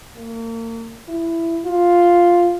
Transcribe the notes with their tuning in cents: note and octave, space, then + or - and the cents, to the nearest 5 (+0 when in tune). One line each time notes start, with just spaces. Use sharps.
A#3 -35
E4 +15
F4 +0